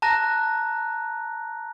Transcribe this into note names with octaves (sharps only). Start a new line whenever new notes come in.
A5 A#5 F#6 A#6